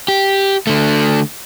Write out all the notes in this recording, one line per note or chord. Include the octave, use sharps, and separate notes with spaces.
G4
D3 A3